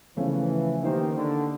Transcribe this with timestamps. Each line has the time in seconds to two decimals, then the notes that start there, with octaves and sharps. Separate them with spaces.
0.17 C#3 E3 F3 A3 C#4
0.82 D#3 A#3 D#4 G4 C5
1.15 D3